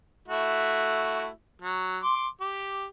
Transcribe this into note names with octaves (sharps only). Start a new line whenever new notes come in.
A3 E4 F#4
F#3
C6 D6
G4